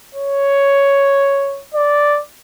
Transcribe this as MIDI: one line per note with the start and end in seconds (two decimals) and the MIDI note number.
0.15 1.61 73
1.74 2.19 74